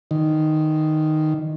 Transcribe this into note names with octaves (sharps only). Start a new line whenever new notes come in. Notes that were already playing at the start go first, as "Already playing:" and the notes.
D#3